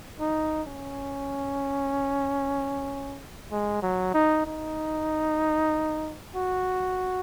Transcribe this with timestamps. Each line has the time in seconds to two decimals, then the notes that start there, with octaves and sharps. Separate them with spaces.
0.20 D#4
0.67 C#4
3.52 G#3
3.82 F#3
4.14 D#4
4.46 D#4
6.35 F#4